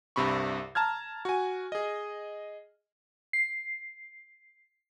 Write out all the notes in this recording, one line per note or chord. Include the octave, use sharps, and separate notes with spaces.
C2 G2 C3 B5 C#6
A5 A#5 F6 G#6
F#4 G#5
G#4 D#5
C7